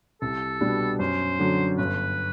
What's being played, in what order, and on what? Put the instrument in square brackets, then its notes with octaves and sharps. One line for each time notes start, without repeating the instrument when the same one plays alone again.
[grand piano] C2 [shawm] A4
[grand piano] B2 G3 B3 D4
[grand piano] F#2 [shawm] C5
[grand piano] D3 F#3
[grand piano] G1 [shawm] B4